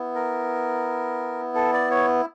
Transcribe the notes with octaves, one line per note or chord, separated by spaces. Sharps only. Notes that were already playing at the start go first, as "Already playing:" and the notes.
Already playing: B3 E4
A#4
A4
D5
C#5